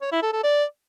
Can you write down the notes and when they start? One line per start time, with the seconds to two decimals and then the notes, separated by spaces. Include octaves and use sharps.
0.01 C#5
0.12 E4
0.23 A4
0.33 A4
0.44 D5